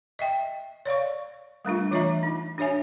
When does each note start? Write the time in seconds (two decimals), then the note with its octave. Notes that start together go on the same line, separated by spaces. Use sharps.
0.19 D#5 E5 G5
0.85 C#5 D5 F5 C#6
1.65 G3 A3 D4 F4
1.91 E3 F4 C#5 D#5 E5 A#5
2.23 D#4
2.58 D4 F#4 C#5 E5 G#5